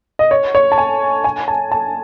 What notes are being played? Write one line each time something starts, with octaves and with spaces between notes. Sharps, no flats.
D#5
C#5
C#5
A5
G#5
G#5
A5
A5